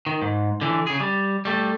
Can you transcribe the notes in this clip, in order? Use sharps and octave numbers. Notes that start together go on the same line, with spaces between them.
D#3
G#2
D3 E3
C#3 G#4
G3
G3 A3